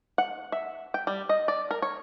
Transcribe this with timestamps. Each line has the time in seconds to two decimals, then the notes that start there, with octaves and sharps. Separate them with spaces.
0.18 F#5
0.52 E5
0.94 G5
1.07 G3
1.29 D#5
1.48 D5
1.71 A#4
1.82 C#5